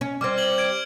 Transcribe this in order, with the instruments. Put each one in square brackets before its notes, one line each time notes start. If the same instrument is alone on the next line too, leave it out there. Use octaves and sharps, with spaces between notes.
[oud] C#4
[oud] G3 C4 [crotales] D6 F6 G#6
[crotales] G#6 F#7 G7
G#6 D7